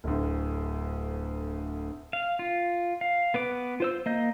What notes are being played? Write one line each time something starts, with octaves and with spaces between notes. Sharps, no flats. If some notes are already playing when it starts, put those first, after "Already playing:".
D1 D2
F5
F4
F5
B3 B4 D6
F4 C5 E6
A#3 D#5 G6